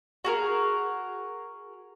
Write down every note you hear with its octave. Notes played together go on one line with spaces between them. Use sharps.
F#4 G#4 A#4